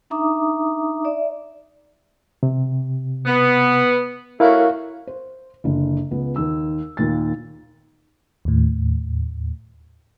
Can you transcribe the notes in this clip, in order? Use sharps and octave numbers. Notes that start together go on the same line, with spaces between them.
D4 D#4 E5 A#5 D6 D#6
D5 E5
C3
B3
A3 C#4 E4 F#4 A#4 F5
C5
F#1 D3
C#2 B3
D#2 E6
D#2 A#2 A6
D#2 A2